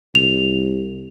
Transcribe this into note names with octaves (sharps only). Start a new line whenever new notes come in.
C2 F7